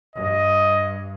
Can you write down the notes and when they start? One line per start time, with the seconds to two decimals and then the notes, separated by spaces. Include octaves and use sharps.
0.16 G2 D#5